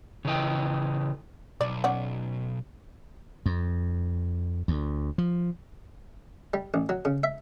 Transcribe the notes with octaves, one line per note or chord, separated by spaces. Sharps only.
C#3 E3 D#5 G5
B1 D5
C#4 D5 F#5
F2
D2
F3
G3
A1
F#3
C#3
E5